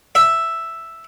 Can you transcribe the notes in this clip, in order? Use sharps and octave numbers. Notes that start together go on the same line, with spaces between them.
E5